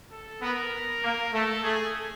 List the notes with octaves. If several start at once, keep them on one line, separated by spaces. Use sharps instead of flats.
A4
B3 A#4
A#3
A3 A4
A3 G#4